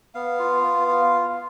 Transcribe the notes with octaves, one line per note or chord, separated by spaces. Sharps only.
B3 F5
F4
B3
F4